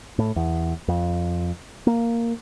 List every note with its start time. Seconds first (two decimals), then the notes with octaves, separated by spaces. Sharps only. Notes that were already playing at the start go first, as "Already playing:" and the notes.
0.19 A2
0.36 E2
0.88 F2
1.87 A#3